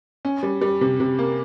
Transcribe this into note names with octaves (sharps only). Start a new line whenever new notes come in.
C#4
G3
G3
C3
C3
A#3